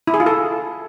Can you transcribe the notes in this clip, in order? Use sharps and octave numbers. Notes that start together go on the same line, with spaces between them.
E4
G#4
F4
A4